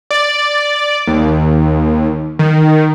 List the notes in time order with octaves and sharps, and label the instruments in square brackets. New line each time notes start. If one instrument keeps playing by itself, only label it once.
[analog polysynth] D5
D#2
D#3